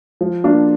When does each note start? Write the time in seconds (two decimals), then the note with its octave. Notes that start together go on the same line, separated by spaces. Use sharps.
0.21 F3
0.44 A#3 D4 F4